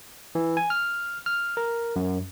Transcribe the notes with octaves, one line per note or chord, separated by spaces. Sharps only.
E3
G#5
F6
F6
A#4
F#2